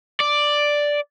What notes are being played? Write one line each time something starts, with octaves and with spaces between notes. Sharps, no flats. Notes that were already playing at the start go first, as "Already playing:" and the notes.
D5